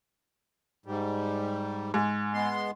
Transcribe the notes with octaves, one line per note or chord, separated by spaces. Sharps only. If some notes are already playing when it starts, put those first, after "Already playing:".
G#2 G3
G#2
G#3 B3 C6